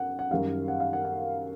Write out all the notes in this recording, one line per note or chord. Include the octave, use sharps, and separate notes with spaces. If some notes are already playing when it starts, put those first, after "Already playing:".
Already playing: F#2 F#5
F#5
F#2 D#3 G3 F5
F#5
F5
F#5
F#5